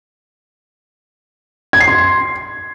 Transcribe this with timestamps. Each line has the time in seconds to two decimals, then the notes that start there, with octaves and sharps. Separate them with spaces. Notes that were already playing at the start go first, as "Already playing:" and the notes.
1.73 G#6
1.80 C7
1.88 C6